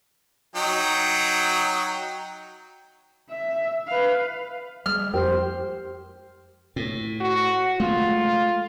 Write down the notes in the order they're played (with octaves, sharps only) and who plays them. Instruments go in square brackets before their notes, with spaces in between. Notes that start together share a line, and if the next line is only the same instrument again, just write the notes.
[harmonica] F#3 D#4 G5
[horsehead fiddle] E5
B4 F5
[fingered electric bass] G3 G#3 [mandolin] F6
[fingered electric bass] F2 [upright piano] G4 [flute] C5
[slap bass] A2
[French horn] F#4
[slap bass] G#3 A3 [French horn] F4